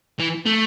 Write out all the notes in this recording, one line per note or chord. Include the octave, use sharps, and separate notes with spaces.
E3
A3